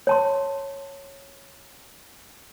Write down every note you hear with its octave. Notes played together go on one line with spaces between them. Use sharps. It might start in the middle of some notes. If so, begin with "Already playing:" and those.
C#5 A5 C6